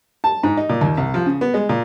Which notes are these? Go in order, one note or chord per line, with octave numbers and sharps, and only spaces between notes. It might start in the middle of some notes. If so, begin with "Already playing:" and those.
A5
G#2
D#4
A#2
D#2
C2
F3
C#3
B3
G#3
A#2